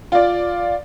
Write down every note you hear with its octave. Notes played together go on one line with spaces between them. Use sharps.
F4 D5